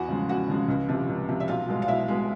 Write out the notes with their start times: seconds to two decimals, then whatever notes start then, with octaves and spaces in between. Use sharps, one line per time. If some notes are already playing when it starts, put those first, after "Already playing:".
Already playing: E2 F#4 F#5
0.08 C#3 F3 G#3
0.28 E2 F#4 F#5
0.48 C#3 F3 G#3
0.68 C#2
0.89 C3 F3
1.09 C#2
1.29 C3 F3
1.40 E5
1.48 B1 F4 F5
1.68 B2 G#3
1.82 F5
1.88 B1 E4 E5
2.08 B2 G#3